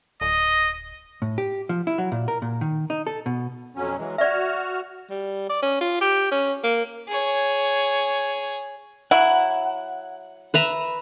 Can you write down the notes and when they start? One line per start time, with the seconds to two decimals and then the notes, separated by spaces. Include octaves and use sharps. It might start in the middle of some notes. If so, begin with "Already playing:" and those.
0.21 D1 D#5
1.22 A2
1.38 G4
1.69 F3
1.87 E4
1.98 F#3
2.12 A#2
2.28 A#4
2.42 A#2
2.61 D#3
2.90 D#4
3.07 A4
3.26 B2
3.76 F2 F#3 C#4
3.98 E3 F#3 G#3
4.18 F#4 D5 E5 F6
5.10 G3
5.50 D5
5.63 C#4
5.81 F4
6.01 G4
6.32 C#4
6.64 A#3
7.08 G#4 C#5
9.11 F#3 E4 F#5
10.54 B4 E5 A#5